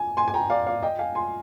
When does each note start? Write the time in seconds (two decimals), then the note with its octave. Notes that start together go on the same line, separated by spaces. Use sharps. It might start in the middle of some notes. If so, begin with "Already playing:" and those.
Already playing: G#5
0.17 G#5 C6
0.28 G#5
0.34 G5 A#5
0.50 D5 F5
0.67 D5 F5
0.83 D#5 G5
0.99 F5 G#5
1.15 G#5 C6